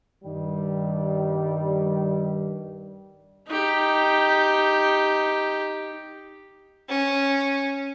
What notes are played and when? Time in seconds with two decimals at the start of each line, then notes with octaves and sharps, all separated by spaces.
0.24 G2 D#3 G3
3.48 D#4 G4
6.89 C#4